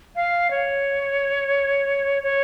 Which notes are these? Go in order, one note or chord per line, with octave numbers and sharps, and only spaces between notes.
F5
C#5
C#5